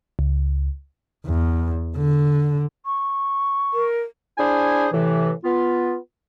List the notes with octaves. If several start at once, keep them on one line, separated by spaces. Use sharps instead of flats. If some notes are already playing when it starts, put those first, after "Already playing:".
C#2
E2
D3
C#6
A#4
D4 E4 G#4 C5 G#5
A2 C3 E3
B3 F4